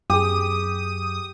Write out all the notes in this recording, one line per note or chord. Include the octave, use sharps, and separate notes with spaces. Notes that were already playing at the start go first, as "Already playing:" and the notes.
F#2 G4 G#4 D#6